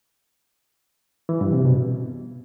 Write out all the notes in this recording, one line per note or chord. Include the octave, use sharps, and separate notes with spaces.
E3
G2
C3
B2